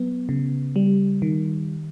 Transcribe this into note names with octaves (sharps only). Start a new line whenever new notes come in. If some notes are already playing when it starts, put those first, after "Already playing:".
Already playing: F#3 B3
C#3
G3
D#3